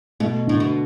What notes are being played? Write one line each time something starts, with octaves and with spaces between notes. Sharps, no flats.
B2 A3
A2 D3
B2